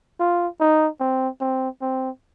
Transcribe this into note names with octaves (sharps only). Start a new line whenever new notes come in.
F4
D#4
C4
C4
C4